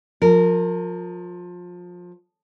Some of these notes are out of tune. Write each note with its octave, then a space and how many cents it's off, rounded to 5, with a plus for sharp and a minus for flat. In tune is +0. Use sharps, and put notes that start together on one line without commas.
F3 +25 A#4 -20